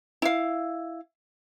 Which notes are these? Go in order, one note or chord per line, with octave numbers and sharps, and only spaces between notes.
E4 F5